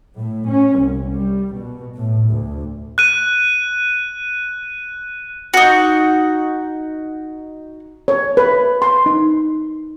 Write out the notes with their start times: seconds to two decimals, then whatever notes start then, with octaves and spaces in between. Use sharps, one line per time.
0.18 A2
0.51 C#4
0.79 C2
1.13 G3
1.56 B2
1.97 A2
2.30 D2
2.98 F#6 D#7
5.54 D#4 F#4
8.08 C#5
8.37 B4
8.82 C6
9.06 D#4